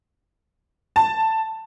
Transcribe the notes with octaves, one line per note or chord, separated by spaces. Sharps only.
A5